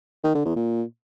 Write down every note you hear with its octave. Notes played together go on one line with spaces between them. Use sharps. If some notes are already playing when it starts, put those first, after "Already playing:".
D#3
D3
E2
A#2